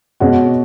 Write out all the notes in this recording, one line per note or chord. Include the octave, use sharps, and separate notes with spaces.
B2 G#3 C#4 F#4